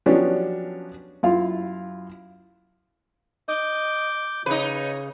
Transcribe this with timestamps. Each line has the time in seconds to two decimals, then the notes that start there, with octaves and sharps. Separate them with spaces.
0.06 F3 F#3 B3 C#4 D4 G4
1.23 F#2 E4 F4 F5
3.49 D#5 D6 G6
4.46 C#3 D#4 B4 C#5